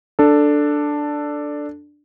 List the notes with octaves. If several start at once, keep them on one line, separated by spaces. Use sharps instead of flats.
D4 A4